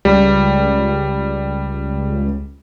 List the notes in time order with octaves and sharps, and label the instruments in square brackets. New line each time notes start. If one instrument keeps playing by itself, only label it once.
[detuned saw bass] C#2 [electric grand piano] G3